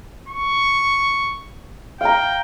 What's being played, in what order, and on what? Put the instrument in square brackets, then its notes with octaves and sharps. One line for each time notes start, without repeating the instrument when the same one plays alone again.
[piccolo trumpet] C#6
[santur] F5 A#5 [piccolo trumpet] G5